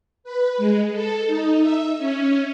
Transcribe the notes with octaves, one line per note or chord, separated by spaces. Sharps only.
B4
G#3
A4
D#4
E5
C#4